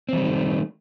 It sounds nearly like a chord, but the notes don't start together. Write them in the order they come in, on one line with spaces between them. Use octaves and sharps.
C4 E3 G3 D#3 A3